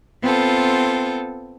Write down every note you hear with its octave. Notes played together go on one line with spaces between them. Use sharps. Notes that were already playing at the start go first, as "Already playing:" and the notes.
B3 C4 F4 A4